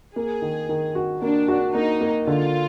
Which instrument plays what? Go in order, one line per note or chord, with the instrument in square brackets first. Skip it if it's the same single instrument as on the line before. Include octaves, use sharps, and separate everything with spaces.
[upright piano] A#3 [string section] G#4
[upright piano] D#3
D#3
F#4
[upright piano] A#3 [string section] D4
[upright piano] F#4
[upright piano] A#3 [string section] D#4
[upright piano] A#3
[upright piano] D3 [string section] F4